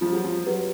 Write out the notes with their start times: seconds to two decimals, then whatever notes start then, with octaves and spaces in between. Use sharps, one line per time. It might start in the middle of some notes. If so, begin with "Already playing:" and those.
0.01 F3 F4
0.12 F#3
0.24 F3
0.47 F#3 B4